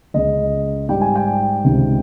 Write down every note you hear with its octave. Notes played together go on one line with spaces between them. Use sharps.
C#2 C#3 G#3 D#5
G#2 G3 G5
G#5
G5
C#2 C3 D#3 G#3